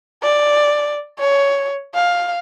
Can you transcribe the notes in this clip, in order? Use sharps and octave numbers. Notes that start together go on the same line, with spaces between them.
D5
C#5
F5